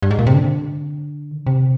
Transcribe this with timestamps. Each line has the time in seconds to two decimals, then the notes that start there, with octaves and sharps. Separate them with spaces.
0.02 G2
0.11 G#2
0.19 A#2
0.27 C3
0.34 D3
1.31 D#3
1.39 D3
1.47 C3